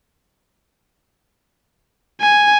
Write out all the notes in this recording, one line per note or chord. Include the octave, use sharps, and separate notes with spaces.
G#5